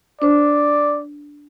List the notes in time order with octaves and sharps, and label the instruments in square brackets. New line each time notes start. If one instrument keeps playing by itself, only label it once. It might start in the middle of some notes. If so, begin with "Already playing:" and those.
[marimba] D4 C5 [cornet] D5